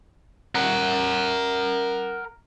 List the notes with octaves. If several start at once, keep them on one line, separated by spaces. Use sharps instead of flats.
A#4 F#5